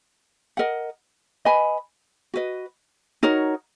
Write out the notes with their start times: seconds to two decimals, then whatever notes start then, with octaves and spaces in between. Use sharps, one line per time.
0.57 A#4 D#5 F#5
1.45 B4 D#5 G#5 B5
2.34 F#4 B4 D#5
3.23 D#4 F#4 A#4 C#5